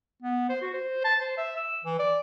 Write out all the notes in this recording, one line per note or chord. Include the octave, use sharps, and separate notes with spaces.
B3
C5
F#4
C5
A5
C5
E5
E6
E3
D5